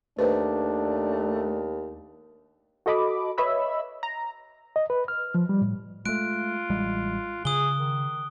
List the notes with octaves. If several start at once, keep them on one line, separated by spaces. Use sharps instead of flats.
D#2 A3 D4 B4 C5
F#4 A4 D#5 B5 D6
B4 C#5 D#5 E5 B5 E6
A#5
D#5
B4
F6
F3
G3
A2
G#3 A3 F4 F#6 D7
A1 G3 G#3
C#3 G#4 D#6 G7
D#3